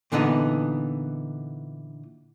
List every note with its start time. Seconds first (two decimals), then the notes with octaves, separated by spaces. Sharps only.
0.12 A#2 D3 E3 B3 D#4